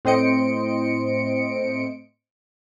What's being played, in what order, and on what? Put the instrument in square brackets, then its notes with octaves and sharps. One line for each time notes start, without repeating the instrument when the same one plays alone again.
[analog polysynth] A2 C4 C5 D#5 C#7 D7